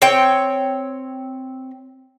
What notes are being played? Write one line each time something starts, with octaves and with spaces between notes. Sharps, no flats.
C4 C#5 G5